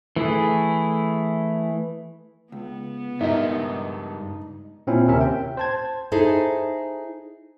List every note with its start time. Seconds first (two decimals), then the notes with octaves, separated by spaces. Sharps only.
0.16 E3 A3 E4 G#4
2.52 C#2 B3
3.21 C#2 G2 D#4 G4 A#4 E5
4.87 A#2 C4 C#4 E4
5.07 D#2 C3 C#4 A#4 E5
5.21 G5
5.57 C5 A5 G#6
6.12 D#4 E4 G#4 A4 C5 D#5